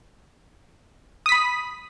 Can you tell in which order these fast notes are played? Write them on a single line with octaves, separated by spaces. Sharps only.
D#6 B6 B5